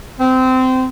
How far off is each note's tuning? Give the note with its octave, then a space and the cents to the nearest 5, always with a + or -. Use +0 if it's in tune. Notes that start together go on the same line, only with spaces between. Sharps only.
C4 -20